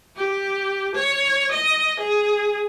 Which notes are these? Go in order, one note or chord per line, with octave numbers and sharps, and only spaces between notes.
G4
C#5
D#5
G#4